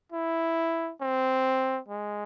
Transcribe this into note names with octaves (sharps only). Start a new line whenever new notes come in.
E4
C4
G#3